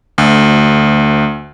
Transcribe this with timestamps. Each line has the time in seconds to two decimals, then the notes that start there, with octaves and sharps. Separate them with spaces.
0.18 D2